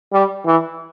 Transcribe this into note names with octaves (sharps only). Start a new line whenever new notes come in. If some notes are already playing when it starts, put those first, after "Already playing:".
G3
E3